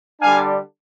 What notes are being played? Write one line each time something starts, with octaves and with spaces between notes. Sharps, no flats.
D3 G3 D4 F5 G#5